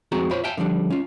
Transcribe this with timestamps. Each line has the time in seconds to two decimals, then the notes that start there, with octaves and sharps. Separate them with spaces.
0.12 F2 G#3 C4 F#4 G#4 A#5
0.31 F4 C5 C#5 B5
0.44 E5 F5 G5 A5
0.57 D3 F3 G3 D4
0.90 C#4 F4